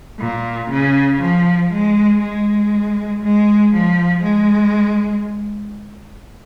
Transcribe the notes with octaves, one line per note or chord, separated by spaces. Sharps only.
A#2
C#3
F3
G#3
G#3
G#3
F3
G#3